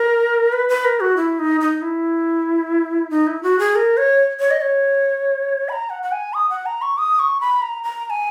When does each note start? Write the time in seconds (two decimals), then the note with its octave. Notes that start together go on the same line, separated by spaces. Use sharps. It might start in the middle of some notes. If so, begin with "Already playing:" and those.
Already playing: A#4
0.53 B4
0.69 B4
0.85 A#4
1.00 F#4
1.17 E4
1.39 D#4
1.61 D#4
1.82 E4
3.10 D#4
3.27 E4
3.43 F#4
3.59 G#4
3.76 A#4
3.97 C#5
4.40 C#5
4.51 D#5
4.61 C#5
5.69 B5
5.73 A#5
5.90 F#5
6.03 F#5
6.12 G#5
6.34 D#6
6.50 F#5
6.66 A#5
6.82 C#6
6.98 D#6
7.19 C#6
7.41 B5
7.62 A#5
7.84 A#5
8.06 A#5
8.10 G#5